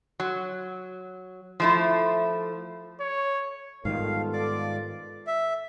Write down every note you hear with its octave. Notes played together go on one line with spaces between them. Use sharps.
F#3
F3 A3 E4
C#5
G#2 D#3 G3 B3 F4 A4 F5
D5 D6
E5